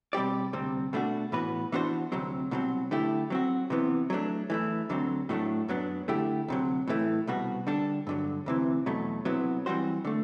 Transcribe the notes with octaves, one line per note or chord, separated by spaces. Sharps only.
B2 G3 C4 G4 D5
D2 C3 G3 C4
B2 A3 D4 F#4
A2 E3 B3 F#4 B4
E3 B3 D4 F#4 C5
D2 C3 F#3 C4
C2 B2 F#3 C4
D3 A3 E4 G4
F#3 C4 F#4
C3 E3 B3
F#3 A3 D4
E3 A3 E4
D2 D3 F#3 C4
A2 F#3 A3 D4
F#2 F#3 B3 D4
D3 A3 E4 G4
D2 C3 F#3
A2 E3 A3
C2 B2 G3 B3 F#4
D3 G3 D4 A4
G2 D3 F#3
D2 C3 E3
E2 B2 F#3 A3
C3 F#3 B3 E4
E3 G3 C4 F#4 C5
D3 A3